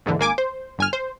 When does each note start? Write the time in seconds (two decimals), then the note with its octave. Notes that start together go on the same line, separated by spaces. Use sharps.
0.06 D#2 G#2 D3 E3
0.19 G#1 A#3 G#5 D6
0.38 C5
0.78 G1 G#5 F6
0.93 C5